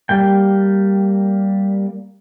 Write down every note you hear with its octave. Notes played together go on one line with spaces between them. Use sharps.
G3 A#3 G5